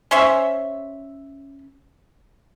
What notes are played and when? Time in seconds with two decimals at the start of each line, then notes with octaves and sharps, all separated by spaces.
0.11 C#4 C5 C#5 E5